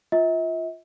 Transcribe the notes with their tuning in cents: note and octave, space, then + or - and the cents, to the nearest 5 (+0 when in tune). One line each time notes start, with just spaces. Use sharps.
F4 +0 E5 -45